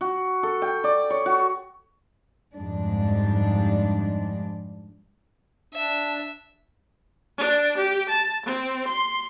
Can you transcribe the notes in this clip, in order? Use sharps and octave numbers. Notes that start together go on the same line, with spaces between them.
F#4
A4
G5
D5
C#5
F#4
F2 G#2 G3 G#3 D4
D4 E5
D4
G4
A5
C4
C6